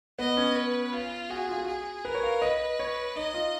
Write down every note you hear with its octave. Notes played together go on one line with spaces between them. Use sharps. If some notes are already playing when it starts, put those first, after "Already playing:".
B3 D#5
C#4
B4
F4
F#4 G#4
F4
F#4
G#4
A#4 B4
C#5
F5
B4 D#5
C#5
D#4 D#5
F4